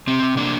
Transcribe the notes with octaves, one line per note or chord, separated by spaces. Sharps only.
C3 C4
C3
A#3 D4